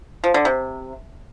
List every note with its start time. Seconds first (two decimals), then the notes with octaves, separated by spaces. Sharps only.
0.24 F3
0.34 D3
0.45 C3